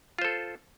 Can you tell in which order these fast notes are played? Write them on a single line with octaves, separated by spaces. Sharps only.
F4 C5 A4